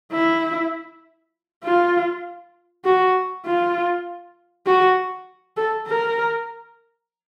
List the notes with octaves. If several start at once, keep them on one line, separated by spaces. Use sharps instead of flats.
E4
F4
F#4
F4
F#4
A4
A#4